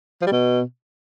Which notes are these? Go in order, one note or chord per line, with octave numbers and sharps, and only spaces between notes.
F3
G3
B2